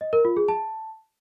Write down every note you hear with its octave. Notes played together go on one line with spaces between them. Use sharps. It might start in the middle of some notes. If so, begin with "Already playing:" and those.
D#5
A#4
F4
G#4
A5